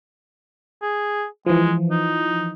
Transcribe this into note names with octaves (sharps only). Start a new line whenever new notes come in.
G#4
E3 F3 G#3
D#4